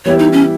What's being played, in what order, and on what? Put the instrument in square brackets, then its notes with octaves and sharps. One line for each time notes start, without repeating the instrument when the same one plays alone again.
[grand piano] E3 G3 B3 E4 G4 [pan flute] C#5
[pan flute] D#4
C#4